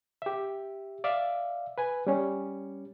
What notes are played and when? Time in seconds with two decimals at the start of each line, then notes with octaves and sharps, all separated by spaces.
0.22 G4 E5
1.04 D5 E5 F5
1.78 B4 G#5
2.07 G3 C#4